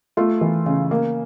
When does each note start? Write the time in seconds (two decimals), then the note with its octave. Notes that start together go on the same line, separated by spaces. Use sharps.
0.17 A3 F4
0.41 E3
0.66 C#3
0.91 A#3